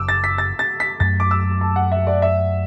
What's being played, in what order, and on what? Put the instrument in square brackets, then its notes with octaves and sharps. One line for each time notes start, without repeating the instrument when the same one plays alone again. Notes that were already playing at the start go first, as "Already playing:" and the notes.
Already playing: [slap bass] F#1 F#2 F#3 [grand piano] D6 E6
[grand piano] A6
B6
A6
A6
B6
[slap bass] F#2 F#3 A3 [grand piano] A6
[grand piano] D6
E6
A5
F#5
E5
D5
E5